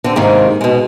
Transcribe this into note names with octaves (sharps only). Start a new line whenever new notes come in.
D3 C4
G#2 C3 D#3 A#3
B2 G#3